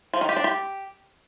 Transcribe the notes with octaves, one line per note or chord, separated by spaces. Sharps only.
F3
D#3
G4
D4
G4